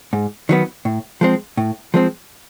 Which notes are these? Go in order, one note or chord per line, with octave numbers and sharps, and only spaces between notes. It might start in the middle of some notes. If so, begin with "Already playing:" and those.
G#2
D#3 F#3 B3
A2
F3 G#3 C4
A2
F3 G#3 C4